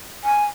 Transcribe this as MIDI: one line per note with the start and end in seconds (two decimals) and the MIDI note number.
0.24 0.45 80